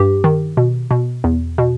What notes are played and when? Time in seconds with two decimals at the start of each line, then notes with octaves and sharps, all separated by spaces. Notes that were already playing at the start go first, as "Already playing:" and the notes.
Already playing: G2 G4
0.24 D#3
0.57 B2
0.91 B2
1.24 E2
1.58 B2